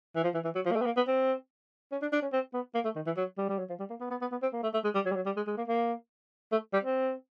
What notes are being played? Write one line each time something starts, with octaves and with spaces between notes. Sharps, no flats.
E3
F3
E3
E3
F#3
F3
A#3
A3
B3
A#3
B3
C4
C#4
D4
D4
C#4
C4
B3
A#3
A3
D#3
E3
F#3
G3
G3
F#3
F3
G3
A#3
B3
B3
B3
B3
C4
A#3
A3
A3
G#3
G3
F#3
G3
F#3
G3
G#3
G#3
A#3
A#3
A3
G3
C4